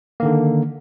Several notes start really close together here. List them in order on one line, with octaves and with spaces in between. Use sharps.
A#3 D#3 D3